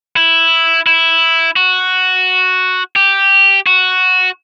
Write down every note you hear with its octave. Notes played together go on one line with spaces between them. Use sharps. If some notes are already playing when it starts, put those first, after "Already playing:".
E4
E4
F#4
G4
F#4